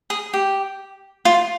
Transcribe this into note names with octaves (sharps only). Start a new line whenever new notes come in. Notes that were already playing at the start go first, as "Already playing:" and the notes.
G#4
G4
F4